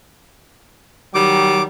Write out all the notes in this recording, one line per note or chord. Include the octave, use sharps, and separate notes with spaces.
D#3 F#3 G3 D6